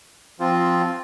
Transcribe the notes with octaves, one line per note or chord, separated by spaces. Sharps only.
F3 C4 F4